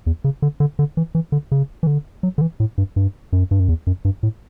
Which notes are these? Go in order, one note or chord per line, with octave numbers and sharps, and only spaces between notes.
E2
C#3
D3
D3
D3
E3
E3
D3
C#3
E3
D3
F#3
D3
E3
A2
G2
G2
F#2
G2
F#2
E2
F#2
G2
A2